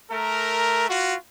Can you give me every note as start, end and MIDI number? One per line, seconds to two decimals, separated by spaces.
0.11 0.89 57
0.11 0.89 70
0.90 1.16 65
0.90 1.16 66